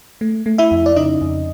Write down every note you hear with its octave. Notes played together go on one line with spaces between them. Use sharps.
A3
A3
E4 E5
F2
D5
C#3 D#4 D#5
F2